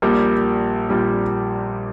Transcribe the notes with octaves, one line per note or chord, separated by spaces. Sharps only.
A#1 A#2 G3 A#3 G4
A#1 A#2 G3 A#3 G4